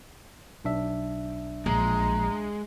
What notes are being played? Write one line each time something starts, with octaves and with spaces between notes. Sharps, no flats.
B1 D4 E5
A#1 G#3 A#5